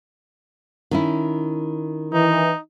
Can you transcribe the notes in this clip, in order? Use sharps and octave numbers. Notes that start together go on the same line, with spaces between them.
D#3 C#4 E4
E3 D#4